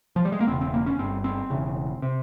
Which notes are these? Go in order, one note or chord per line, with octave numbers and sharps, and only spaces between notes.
F3
G3
G#3
A#3
E1 E2 C#3 C4
C4
A#3
C#4
G1 G2 C4
C4
E1 E2 C#3
C3